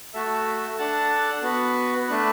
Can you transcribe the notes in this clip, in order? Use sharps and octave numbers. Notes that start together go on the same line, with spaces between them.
A3 F#4 A4 E5
D4 A4 F#5 A5
B3 F#4 B4
A3 D4 B4